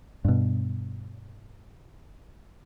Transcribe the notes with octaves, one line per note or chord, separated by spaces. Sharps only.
G2 B2